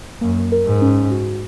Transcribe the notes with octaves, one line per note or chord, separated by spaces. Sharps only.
F#2 A#3
A#4
G#2
C#4
F#4